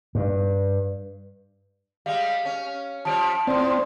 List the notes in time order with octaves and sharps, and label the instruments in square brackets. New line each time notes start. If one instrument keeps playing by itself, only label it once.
[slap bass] G2
[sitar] G3 G#3 [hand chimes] F5
[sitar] C#4
[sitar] F3 G3 [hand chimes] A5 D7
[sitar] A2 F3 [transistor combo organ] C4 [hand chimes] D5 C6